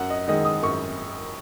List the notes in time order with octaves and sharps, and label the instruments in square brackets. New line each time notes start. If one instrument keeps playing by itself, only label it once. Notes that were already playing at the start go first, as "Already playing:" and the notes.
Already playing: [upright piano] F#2 F#5
D#5
D#3 G#3 D#5
D#6
F#2 C#6